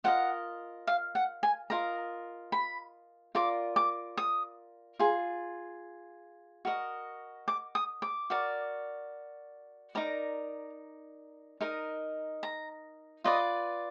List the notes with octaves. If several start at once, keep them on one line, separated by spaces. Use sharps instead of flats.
F4 A#4 D#5 F#5
F5
F#5
G#5
F4 A#4 D#5 A#5
B5
F4 A#4 D5 D6
D6
D#6
F4 G#4
F#4 A#4 D#5
D6
D#6
D6
F#4 A#4 D5
D#4 A#4 D5 A#5
D#4 A#4 D#5
A#5
F4 B4 D5 D#5